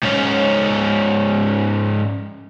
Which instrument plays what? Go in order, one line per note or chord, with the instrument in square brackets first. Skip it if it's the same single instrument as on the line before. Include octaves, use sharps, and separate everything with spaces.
[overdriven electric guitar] G#2 C#4